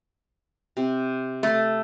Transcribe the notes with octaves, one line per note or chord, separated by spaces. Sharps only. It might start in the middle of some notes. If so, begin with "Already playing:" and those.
C3
A3